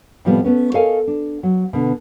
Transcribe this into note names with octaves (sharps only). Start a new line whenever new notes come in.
A2 C3 F3 G3 B3
A3 B3 C#4
A4 A#4 C#5 D#5 F5 G#5
D4
F#3
B2 D3